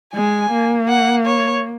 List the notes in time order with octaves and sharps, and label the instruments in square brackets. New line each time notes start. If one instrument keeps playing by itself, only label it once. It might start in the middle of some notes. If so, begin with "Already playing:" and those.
[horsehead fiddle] G#3 [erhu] G#5
[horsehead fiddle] A#3
[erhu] F#5
C#5